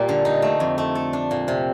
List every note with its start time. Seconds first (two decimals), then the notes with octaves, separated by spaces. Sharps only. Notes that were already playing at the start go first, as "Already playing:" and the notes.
Already playing: A#2 G3 A#3
0.09 D3
0.25 D#4
0.42 A3
0.60 F2
0.78 A3
0.95 A4
1.13 D4
1.31 A#2
1.48 C3